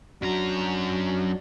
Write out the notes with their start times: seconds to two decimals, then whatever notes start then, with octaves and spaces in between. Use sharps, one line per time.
0.22 F#2 F#3 D4 F#4 A#5